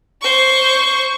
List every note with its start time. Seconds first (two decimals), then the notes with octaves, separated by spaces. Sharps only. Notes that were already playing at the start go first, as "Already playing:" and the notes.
0.21 C5 C#6